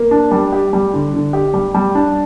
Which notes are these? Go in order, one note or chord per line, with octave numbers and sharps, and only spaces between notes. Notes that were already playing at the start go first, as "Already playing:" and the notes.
Already playing: A#3
D4
G3
G4
G3
D3
D3
G4
G3
G3
D4